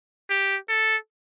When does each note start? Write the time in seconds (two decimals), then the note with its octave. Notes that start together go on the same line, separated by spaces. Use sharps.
0.30 G4
0.69 A4